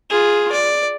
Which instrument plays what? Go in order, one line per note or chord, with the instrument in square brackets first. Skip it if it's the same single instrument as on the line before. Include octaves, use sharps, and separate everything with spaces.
[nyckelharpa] F4 G#4
D5